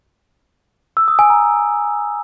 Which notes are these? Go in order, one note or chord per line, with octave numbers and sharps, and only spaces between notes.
E6
D#6
G#5
A#5